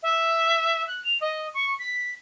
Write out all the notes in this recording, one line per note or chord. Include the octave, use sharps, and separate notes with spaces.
E5
F#6
F7
D#5
C#6
B6